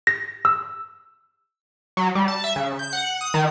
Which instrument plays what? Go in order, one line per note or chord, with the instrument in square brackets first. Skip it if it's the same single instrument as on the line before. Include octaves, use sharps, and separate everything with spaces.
[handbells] A#6
E6
[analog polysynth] F#3
G3
A5
E5
C#3
G6
F#5
D#6
D#3